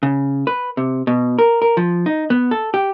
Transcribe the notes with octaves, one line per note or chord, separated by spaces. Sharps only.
C#3
B4
C3
B2
A#4
A#4
F3
D#4
B3
A4
G4